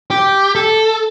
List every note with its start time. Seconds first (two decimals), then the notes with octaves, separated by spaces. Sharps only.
0.10 G4
0.55 A4